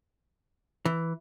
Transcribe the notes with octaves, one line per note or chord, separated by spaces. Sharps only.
E3